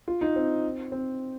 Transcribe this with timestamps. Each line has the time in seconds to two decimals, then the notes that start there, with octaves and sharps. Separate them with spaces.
0.08 F4
0.21 D#4
0.36 C4
0.92 C4